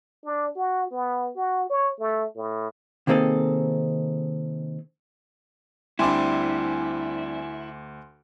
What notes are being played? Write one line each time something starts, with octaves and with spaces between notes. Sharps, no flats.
D4
F#4
B3
F#4
C#5
A3
A2
C3 D#3 A#3 C4 G#4 A4
D2 G3 C4 D4 E4 G#5 C6 D6